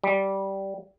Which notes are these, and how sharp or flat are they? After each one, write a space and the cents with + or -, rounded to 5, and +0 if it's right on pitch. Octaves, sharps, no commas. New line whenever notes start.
G3 -10